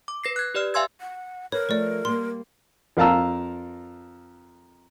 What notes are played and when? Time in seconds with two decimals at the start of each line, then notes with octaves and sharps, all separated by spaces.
0.08 D6
0.24 B4 A#6 C7
0.36 F#6 G#6
0.54 G4 B4 D5 F6
0.74 E5 F5 G#5 C6 E6 G#6
1.01 F#5
1.52 A#4 B4 C#5
1.69 F3 A3 B4 D5
2.05 G3 A3 A#3 C6
2.97 F2 A#4 F5 A5 A#5 E6